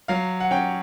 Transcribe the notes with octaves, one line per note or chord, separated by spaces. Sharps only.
F#3 F5
F#5
C#4 G5